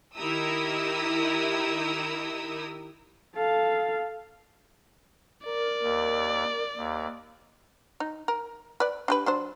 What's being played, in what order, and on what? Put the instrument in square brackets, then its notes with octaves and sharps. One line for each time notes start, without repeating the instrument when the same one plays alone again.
[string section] D#3 E4 G4 A#4 D#6 E6
[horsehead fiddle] A4 F5
[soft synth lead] A#4 [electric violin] D5
[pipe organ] D#2
D#2
[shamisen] D#4
A#4
B4 D5
D4 G4 B4
F#3 D4 C5